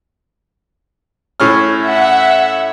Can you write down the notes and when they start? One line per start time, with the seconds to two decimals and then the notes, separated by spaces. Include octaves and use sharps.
1.40 A2 C#4 F6
1.83 E5 F#5